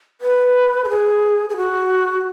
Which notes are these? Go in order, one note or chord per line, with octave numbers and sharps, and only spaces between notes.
B4
A4
G#4
G#4
F#4